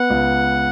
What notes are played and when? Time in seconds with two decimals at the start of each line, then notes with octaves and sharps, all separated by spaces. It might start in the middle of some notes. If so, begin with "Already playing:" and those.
Already playing: B3 F#5
0.10 C#2